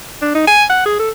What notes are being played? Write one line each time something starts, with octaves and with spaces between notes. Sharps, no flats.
D4
D#4
G#5
F#5
G#4
A4